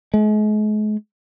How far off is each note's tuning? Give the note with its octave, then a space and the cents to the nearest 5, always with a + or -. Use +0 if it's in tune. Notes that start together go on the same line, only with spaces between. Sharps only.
G#3 +40